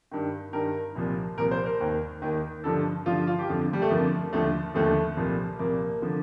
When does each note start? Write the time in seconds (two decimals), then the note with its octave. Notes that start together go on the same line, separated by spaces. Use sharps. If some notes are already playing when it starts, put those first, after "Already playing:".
0.11 G2 D#3
0.53 G2 D#3 A#4
0.95 C2 A#2 F3
1.38 C2 A#2 F3 A#4
1.51 C5
1.66 A#4
1.80 D#2 D#3
2.22 D#2 D#3
2.64 G2 D3 F3 A4
3.06 G2 D3 F3 F4
3.27 F4
3.39 G4
3.49 F2 D3 F3
3.73 G3
3.82 A3
3.90 F2 D3 F3 A#3
4.33 D#2 D3 F3 A3
4.74 D#2 D3 F3 A3
5.17 C2 A#2 F3
5.59 C2 A#2 F3 A#3
6.02 D3 F3